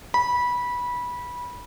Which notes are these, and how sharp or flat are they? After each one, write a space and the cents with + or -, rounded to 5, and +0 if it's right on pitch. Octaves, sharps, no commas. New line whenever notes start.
B5 -20